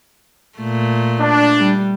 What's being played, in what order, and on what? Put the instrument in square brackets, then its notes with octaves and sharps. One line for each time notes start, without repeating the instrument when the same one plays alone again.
[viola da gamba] A#2 A3
[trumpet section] D4
[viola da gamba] G3